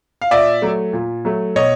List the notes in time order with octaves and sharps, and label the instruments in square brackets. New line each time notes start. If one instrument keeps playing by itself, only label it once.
[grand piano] F5
A#2 D5 E5
F#3 A3
A#2
F#3 A3
B2 C#5 D#5